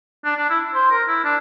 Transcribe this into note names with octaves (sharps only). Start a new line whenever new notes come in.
D4
D4
E4
C5
A#4
E4
D4